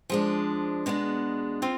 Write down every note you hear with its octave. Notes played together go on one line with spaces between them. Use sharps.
F3 G#3 D4
B2 G#3 B3 D4
C4 F4